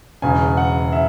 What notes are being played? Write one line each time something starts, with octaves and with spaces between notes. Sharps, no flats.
E1 E2 C#3 G#5
F#5
E5